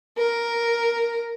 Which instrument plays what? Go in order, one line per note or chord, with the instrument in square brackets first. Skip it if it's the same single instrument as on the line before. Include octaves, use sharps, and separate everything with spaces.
[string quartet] A#4